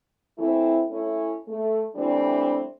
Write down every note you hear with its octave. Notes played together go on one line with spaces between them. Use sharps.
E3 A3 C4 E4
A3 C#4 E4
A3
E3 G3 A3 C4 D4